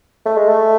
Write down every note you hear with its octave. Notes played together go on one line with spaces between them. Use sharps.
A3
G#3
A3